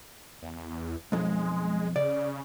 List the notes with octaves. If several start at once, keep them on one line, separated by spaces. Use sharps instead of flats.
E2
B1 F2 G#3
C#3 D5